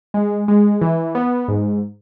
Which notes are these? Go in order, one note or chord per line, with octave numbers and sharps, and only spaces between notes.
G#3
G#3
E3
B3
G#2